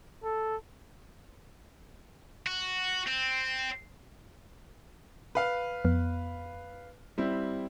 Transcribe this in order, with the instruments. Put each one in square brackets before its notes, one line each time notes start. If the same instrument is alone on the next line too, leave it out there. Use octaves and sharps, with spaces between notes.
[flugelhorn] A4
[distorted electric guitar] F#4
C4
[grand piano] B4 F5
[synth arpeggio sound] F2 B3
[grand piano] G3 C4 E4